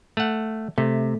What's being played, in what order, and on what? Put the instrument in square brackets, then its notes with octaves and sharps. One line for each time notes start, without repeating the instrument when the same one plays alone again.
[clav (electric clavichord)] A3 F#5
[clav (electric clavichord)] C3 [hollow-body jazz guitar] A3